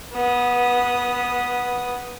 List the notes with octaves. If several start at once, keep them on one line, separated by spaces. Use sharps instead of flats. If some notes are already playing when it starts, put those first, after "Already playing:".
B3 D#6